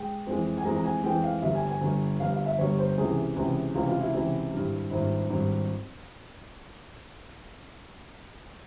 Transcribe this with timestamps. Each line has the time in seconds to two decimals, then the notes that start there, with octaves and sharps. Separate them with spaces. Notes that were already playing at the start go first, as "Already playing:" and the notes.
Already playing: G#3 G5
0.27 F2 E3 G#3
0.58 G#5
0.65 F2 E3 G#3 A#5
0.76 A#5
0.84 G#5
1.03 F2 E3 G#3 G5
1.23 F5
1.42 G1 G2 G3 E5
1.55 G#5
1.68 G#5
1.81 G1 G2 G3
2.20 G1 G2 G3 F5
2.33 F5
2.46 E5
2.58 G1 G2 G3 C#5
2.78 C5
2.98 C#2 C3 E3 G#4
3.36 C#2 C3 E3
3.75 C#2 C3 E3 F4
3.88 F4
4.01 E4
4.14 C#2 C3 E3 E4
4.52 G#1 G2 G3
4.91 G#1 G2 G3 E4
5.30 G#1 G2 G3